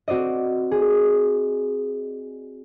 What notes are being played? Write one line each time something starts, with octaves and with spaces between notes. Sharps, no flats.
C4 F#4 C5 D5 D#5
G#4